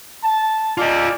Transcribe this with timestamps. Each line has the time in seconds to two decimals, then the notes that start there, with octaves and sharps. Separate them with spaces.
0.23 A5
0.77 F4 G#4 D5 D#5